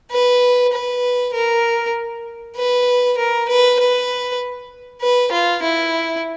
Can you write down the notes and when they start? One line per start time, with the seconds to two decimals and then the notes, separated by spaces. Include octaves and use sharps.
0.11 B4
0.73 B4
1.34 A#4
2.57 B4
3.18 A#4
3.49 B4
3.80 B4
5.02 B4
5.32 F4
5.63 E4